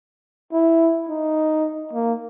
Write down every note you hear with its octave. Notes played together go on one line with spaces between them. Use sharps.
E4
D#4
A#3